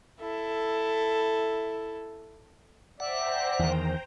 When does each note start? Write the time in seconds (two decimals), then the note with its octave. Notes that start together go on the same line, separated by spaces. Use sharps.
0.21 E4 A4
3.00 C5 D5 E5 F#5 G5 A#5
3.59 E2 D#3